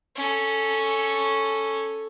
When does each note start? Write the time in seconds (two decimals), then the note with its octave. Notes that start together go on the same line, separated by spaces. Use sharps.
0.16 C#4 A4